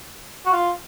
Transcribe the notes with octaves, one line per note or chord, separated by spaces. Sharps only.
F#4
F4